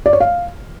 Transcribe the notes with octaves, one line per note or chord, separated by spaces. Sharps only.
D5
C#5
F5